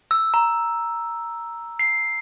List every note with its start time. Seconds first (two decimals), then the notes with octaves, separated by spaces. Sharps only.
0.11 E6
0.34 A#5
1.79 C7